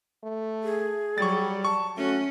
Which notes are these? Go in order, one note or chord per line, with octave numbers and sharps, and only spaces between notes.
A3
G#4
F#3 G3 C#6 A6
A5 C#6
A3 C#4 F#4